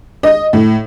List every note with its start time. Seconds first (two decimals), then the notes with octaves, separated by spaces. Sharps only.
0.23 D#5
0.53 A2